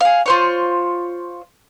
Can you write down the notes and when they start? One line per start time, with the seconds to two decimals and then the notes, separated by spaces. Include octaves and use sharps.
0.01 G#4 F5
0.26 F4 C5 C#5